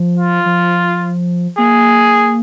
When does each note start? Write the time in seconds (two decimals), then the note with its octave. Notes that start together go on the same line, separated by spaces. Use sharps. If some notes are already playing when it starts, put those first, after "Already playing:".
Already playing: F3
0.17 F4
0.46 F3
1.58 A#3 G#4